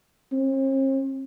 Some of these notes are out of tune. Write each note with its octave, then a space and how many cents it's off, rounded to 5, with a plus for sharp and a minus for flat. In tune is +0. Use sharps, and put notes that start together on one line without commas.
C4 +45